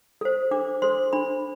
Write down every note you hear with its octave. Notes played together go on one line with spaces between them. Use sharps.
A4 C5
D4 D6
A4 C5 C6
D4 B5